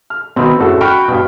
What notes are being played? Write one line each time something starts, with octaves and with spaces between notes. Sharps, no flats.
F6
B2 D#3 B3 C4
F#1 A2 F#4 A4
F#4 G5 B5 F6
G2 B2